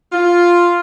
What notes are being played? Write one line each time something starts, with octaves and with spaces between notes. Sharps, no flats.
F4